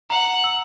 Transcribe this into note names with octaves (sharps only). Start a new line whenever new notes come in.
F#5 A#5
E6